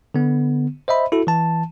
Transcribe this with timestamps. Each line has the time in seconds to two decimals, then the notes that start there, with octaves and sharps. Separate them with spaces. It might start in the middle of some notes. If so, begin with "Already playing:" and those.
0.14 D3 B3
0.88 C5 D#5 E5 B5
1.12 E4 F#4 A4
1.27 E3 A5